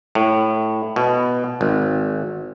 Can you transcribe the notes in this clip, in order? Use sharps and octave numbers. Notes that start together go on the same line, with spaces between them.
A2
B2
G#1